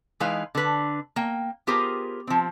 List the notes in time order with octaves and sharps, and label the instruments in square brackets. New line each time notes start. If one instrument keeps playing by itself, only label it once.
[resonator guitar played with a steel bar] E3 G#3 D#4 B4 F5
D3 B4
A#3 G5
B3 F4 G4 G#4 A#4 C5
F3 C4